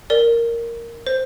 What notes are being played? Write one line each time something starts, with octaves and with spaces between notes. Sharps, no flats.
A#4 D5
C5